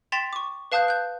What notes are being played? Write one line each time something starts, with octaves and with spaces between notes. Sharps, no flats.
G5 C6 A6 B6 E7 F7
C#6 D6
B4 F5 A5 D#6 F#6 G6
F#6 G6